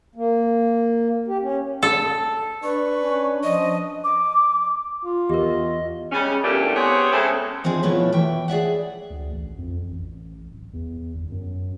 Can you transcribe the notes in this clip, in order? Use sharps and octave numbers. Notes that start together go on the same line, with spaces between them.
A#3
G4
C#4
A4
D4 B4 C#6
C#4
F3 D#5
D6
F4
E2 G4 A#4 D#5
C#3 G3 G#3 C#4
E2 G2 A#2 D3 A3 G4
B3 C4 G4 G#4 C#5
C#3 G#3 A3 C4 A4
F3 C4 D4 D#4 G#4
B2 F3 A3 E4 B4 C#5
E3 E5 G5
G#4 D5 E5 F#5
D2
A1
F2
A1
D1
E2
G1
F#2